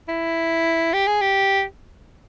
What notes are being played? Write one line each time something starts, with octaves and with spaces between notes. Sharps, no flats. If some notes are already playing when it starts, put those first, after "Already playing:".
E4
G4
G#4
G4